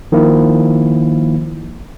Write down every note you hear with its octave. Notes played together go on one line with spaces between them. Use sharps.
D#3 F3 A#3 E4